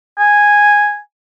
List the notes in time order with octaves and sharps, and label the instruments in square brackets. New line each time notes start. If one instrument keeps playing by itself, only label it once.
[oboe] G#5